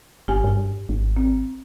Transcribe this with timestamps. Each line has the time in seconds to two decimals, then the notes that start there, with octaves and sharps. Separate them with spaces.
0.28 G1 G4 G#5
0.44 G2
0.89 G#1
1.16 C4